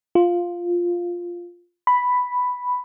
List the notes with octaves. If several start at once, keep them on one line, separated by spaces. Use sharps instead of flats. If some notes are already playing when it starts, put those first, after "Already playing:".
F4
B5